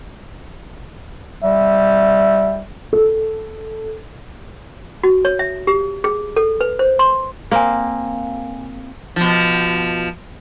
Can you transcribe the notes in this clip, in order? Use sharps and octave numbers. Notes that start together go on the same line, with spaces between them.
G3 E5
A4
F#4
C#5
E5
G4
G#4
A4
B4
C5
C6
A#3 C4 F5 G#5
B2 F3